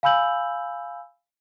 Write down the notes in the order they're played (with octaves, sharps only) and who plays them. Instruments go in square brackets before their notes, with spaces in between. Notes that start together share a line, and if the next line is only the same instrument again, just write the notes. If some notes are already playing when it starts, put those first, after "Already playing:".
[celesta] F5 G#5 B5 E6 G6 F#7